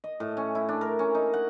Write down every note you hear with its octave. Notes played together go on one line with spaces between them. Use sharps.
D#5
A2
C#4
E4
D4
A#4
C#4
D#4
F#5